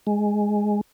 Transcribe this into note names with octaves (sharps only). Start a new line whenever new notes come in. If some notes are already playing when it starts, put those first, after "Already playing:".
G#3